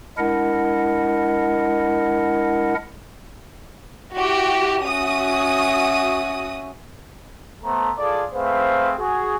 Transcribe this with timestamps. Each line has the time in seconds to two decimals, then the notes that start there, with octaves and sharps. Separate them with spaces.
0.18 G#3 D4 E4 A#4 D#5 F#5
4.15 E4 F#4 G4
4.85 C#4 F#4 E5 D#6
7.64 A3 B3 A4 C5 A#5
7.99 F4 G#4 A4 D5
8.34 A3 C4 G#4 B4 C5 F5
8.99 F#4 G#4